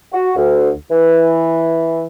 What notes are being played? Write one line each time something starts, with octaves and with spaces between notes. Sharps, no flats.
F#4
D2
E3